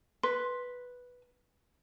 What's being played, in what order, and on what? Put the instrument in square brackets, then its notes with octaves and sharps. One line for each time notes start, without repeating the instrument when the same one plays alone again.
[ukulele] B4 [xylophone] C6